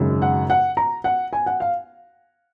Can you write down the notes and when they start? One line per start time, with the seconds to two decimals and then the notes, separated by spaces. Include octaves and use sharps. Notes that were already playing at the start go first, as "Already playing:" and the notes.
Already playing: G#1 F#2 C#3 G#3
0.22 F#5
0.50 F#5
0.77 A#5
1.04 F#5
1.33 G#5
1.46 F#5
1.60 F5